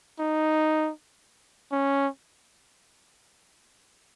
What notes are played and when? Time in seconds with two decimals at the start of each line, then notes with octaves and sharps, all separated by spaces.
0.19 D#4
1.72 C#4